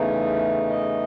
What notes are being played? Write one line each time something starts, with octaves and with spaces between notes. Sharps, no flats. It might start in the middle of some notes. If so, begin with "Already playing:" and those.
Already playing: E2 C#3 E3 A3 D#4
D#5